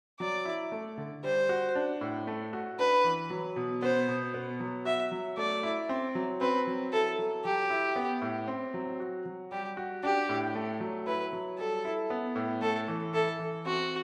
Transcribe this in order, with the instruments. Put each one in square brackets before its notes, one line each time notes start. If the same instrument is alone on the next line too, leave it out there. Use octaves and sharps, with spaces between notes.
[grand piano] F#3 [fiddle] D5
[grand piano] E4
A3
D3
[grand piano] G3 [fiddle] C5
[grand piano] F#4
D4
A2
A3
F#4
[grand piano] D4 [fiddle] B4
[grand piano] E3
F#3
B2
[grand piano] B3 [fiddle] C5
[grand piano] B2
B3
F#3
[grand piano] F#4 [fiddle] E5
[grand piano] F#3
[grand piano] A3 [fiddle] D5
[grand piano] E4
C4
F#3
[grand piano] C4 [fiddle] B4
[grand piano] F#3
[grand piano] E4 [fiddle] A4
[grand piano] F#3
[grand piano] F#3 [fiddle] G4
[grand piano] E4
B3
A2
C4
F#3
F#4
F#3
[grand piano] G3 [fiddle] G4
[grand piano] F#4
[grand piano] D4 [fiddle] G4
[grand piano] A2
A3
F#3
[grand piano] E4 [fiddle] B4
[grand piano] F#3
[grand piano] G3 [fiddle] A4
[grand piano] E4
B3
A2
[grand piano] A3 [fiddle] A4
[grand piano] E3
[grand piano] E4 [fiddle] A4
[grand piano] E3
[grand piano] C4 [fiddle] F#4